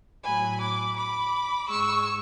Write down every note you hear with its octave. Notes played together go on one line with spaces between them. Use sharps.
A2 F#3 G#5 B5
B5 D6
B5 D6
G#2 G#3 C#6 E6